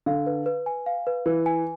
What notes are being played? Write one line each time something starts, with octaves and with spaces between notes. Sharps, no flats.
D3 F5
B4
B4
G#5
F5
B4
E3 B4
G#5